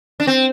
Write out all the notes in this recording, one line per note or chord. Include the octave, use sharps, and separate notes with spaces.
D4
C4